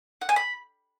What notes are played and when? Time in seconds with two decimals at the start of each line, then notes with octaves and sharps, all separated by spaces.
0.21 F#5
0.29 G#5
0.36 B5